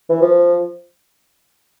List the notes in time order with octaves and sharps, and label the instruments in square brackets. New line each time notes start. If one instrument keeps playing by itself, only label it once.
[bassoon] E3
F3